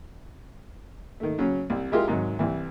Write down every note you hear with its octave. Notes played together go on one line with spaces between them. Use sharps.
D#3 A3
C#3 F#3 C#4
C2
G#3 E4 F4 G4 G#4 A#4
G#2 C3 D#3 F#3
C2 E3